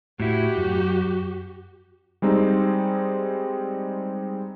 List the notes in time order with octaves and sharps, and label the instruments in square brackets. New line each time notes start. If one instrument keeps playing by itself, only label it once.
[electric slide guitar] A2 E4 [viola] F#4 G4
[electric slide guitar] F#2
[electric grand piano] G3 G#3 C4 D#4